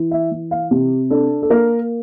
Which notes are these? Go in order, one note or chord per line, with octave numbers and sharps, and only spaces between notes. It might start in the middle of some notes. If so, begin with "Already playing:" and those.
Already playing: E3
E5
E3
F5
C3 G4
D4 A4
A4
A#3 A#4